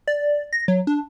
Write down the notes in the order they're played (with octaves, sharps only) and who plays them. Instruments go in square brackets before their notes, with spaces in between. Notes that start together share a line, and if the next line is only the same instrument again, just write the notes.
[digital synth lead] D5
A#6
F#3
D4